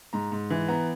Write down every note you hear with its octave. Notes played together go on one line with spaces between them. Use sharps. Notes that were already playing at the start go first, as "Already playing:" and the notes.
G#2 A#5
G#2
E3
B3 A#5